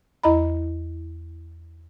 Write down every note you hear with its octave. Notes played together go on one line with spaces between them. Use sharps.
E2 E4 D#5 A#5 B5